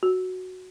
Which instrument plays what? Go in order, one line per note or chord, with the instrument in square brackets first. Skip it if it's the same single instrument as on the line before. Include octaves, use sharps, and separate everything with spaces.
[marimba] F#4